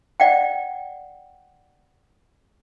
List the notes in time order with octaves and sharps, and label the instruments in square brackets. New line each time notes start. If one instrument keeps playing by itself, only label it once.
[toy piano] D5 F#5 G5